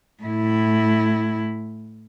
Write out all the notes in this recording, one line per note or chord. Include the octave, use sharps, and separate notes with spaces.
A2 E4